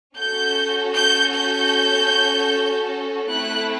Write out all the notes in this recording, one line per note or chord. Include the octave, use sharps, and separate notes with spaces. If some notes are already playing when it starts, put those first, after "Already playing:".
C#4 F#4 A4 G6
G6
G6
A3 C4 E4 F#6